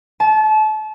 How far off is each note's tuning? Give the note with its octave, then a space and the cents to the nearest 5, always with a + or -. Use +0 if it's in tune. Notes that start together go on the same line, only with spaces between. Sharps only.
A5 -30